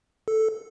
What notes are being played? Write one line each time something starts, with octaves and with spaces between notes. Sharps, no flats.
A4